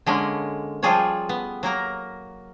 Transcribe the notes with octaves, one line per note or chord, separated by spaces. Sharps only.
D3 G#3 A#3 C#4
F3 G3 F4 G#4 A4 C#5
B3
F#3 A#3 A#4